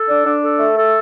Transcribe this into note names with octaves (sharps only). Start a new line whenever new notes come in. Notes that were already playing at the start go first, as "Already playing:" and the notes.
Already playing: A4
D4
D4
A4
A3
A4